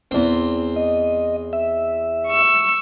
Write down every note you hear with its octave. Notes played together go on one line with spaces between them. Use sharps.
E2 C4
D#5
E5
C#6 E6